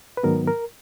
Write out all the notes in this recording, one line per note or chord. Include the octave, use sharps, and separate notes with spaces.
B4
G#2 D#3 F#3 B3 A#4
A#4